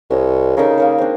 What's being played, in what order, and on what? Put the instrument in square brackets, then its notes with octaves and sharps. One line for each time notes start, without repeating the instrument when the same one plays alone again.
[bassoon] C2 [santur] C#5 D#5
[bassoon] C#3 [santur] D#4 A4 A#4
[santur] A#3 A#4 C#5
C4 D4